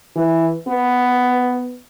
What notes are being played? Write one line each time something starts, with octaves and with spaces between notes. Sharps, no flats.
E3
B3